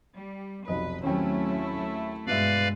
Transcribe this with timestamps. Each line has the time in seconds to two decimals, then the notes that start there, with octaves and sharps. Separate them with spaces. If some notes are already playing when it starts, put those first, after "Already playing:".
0.17 G3
0.68 F1 B1 B4 D#5
1.03 D#2 F#3 A3 C4 C#4 E4 G5
2.27 G2 B2 G#3 B4 D5 E5 F5